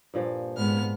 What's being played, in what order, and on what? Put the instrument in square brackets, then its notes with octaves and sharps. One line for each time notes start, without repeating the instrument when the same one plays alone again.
[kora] G2 A#2 F3
[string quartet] G#2 B3 F6